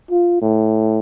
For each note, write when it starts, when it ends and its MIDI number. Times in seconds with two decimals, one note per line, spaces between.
0.11 0.37 65
0.42 1.00 45